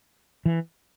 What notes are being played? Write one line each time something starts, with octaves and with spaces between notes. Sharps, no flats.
E3